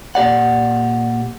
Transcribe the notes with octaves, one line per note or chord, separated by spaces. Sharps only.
A#2 G4 D5 F#5